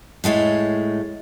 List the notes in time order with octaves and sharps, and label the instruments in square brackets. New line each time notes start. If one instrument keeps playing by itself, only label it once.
[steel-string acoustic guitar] A2 G#3 A3 C#5